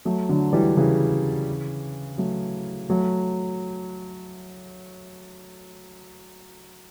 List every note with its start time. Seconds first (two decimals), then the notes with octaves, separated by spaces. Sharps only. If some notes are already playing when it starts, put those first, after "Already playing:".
0.05 F#3 A3
0.29 D3 F#3
0.53 E3 G3
0.77 C#3 E3
2.18 F#3 A3
2.90 F#3 A3